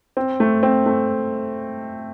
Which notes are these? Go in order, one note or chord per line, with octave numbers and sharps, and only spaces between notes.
C4
A3
C4
A3